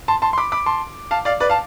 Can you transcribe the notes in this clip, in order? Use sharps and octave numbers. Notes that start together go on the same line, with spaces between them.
A5 C6
A5 C6
C6
B5 D6
B5 D6
A5 C6
F5 A5
D5 F5
B4 D5
F5 A5